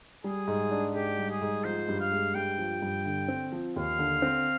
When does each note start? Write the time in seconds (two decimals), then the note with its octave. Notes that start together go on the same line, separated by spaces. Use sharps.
0.24 G3 G#4
0.48 G#2
0.71 D4
0.94 G#2 G4
1.19 G3
1.30 G#4
1.41 G#2
1.64 F3 C5
1.89 G2
2.00 F5
2.12 G#3
2.35 G2 G5
2.59 F3
2.82 G2
3.06 D3
3.28 C4
3.52 F3
3.76 D#2 F5
3.99 D3
4.22 C4